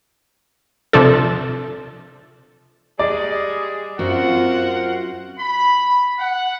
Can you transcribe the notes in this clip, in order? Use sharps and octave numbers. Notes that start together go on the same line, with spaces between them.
C3 F3 D4 A4
G3 G#3 G#4 D5
F#2 C4 F4 F#4 A#4 C5 F#5
B5
F#5